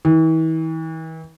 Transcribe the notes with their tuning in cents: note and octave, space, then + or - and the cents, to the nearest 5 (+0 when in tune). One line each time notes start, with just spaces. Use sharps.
E3 -40